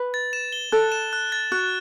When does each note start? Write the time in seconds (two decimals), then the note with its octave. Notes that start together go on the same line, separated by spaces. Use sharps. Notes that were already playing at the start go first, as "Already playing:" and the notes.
Already playing: B4
0.14 A6
0.33 E7
0.52 G7
0.72 A4 F#6
0.92 E7
1.13 F#6
1.32 A6
1.52 F#4 F#6